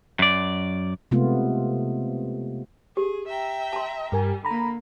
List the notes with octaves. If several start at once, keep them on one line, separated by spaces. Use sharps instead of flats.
F#2 D5
C3 G#3 A3 B3 F4
G4 G#4
E5 G5 A#5
A5 C6
G2 G3 A#4 G#5
D3 A#3 A#5 B5